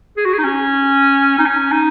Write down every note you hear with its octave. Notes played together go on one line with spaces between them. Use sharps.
G#4
F#4
G#4
D#4
C#4
D#4
C#4
D#4